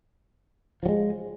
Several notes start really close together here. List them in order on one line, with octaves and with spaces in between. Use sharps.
F3 F#3 G#3